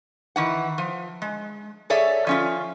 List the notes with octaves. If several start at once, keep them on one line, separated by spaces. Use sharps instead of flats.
D#3 E3 F#5
F3
G#3
G#4 A4 C#5 D5 E5
F3 C#4 F4